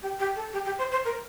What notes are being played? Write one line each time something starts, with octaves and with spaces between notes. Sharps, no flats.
G4
G4
A4
G4
G4
C5
C5
A#4